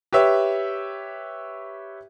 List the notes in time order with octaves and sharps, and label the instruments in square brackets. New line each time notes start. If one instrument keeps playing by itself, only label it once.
[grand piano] G4 B4 C#5 E5